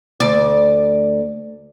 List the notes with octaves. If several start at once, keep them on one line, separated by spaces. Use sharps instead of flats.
D2 D5